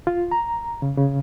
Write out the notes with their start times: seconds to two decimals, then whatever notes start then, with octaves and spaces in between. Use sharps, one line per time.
0.07 F4
0.31 A#5
0.82 C#3
0.98 C#3